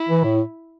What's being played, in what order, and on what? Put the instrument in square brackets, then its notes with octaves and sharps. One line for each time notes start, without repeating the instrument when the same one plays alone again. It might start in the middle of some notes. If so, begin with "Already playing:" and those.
Already playing: [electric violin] E4
[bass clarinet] E3
A2